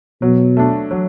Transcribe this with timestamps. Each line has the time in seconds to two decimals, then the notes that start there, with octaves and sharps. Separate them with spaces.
0.22 B2 F#3
0.57 A3 D4
0.91 F#3